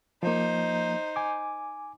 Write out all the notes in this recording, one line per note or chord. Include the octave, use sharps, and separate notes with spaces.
F3 A#3 D#4 C5
G#5 D6